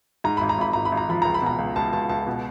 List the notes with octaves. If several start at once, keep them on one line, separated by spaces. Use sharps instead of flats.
G#2 A#5
G#1 B5
A#5
G#1 B5
G#1 A#5
B5
G#1
A#5
F3 B5
C#2 A#5
B5
B2 A#5
C#2
C#2 A5
C#2 A5
C#2 A5
B2